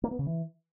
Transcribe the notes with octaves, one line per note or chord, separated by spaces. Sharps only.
A#3
B3
C#3
E3